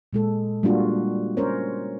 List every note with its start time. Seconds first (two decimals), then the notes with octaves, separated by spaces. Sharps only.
0.13 A#2 G#3 A4
0.63 G3 G#3 A#3 D4 F4 F#4
1.37 C#4 A#4 C5 C#5